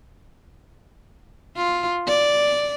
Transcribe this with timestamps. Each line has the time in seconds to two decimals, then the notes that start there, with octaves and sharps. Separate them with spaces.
1.56 F4
2.07 D5